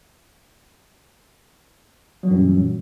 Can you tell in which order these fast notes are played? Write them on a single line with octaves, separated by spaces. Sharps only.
F#3 E3 F#2 G3 A#2